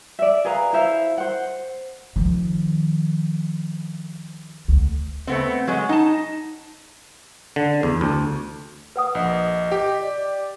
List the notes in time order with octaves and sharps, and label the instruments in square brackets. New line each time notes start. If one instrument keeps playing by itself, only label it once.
[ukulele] D5 E5
G#4 B4 F5 A#5
E4 C5 E5 F5
C5 F#5
[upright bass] D#3 F3
D2
[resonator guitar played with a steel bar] A3 B3 C4
F#3 G#3
D#4 A5
[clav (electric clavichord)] D3
E2
D2
[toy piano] B4 F#5 D#6
[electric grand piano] A#1 [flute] D#5
[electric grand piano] G4
[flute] D5